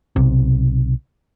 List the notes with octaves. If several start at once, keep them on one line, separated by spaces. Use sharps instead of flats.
B1 C3